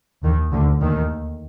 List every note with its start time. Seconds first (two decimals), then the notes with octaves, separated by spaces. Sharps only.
0.24 D#2 D#3
0.53 D2 D3
0.81 D#2 D#3